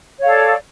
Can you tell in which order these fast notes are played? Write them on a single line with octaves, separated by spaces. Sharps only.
C#5 F5 A4 D5